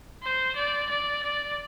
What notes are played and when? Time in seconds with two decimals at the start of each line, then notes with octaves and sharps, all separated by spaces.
0.23 C5
0.56 D5
0.89 D5
1.23 D5